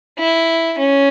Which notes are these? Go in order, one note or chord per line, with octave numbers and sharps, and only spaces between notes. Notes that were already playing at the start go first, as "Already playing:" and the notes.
E4
C#4